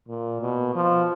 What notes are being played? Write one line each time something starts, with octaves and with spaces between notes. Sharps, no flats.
A#2
B2
F3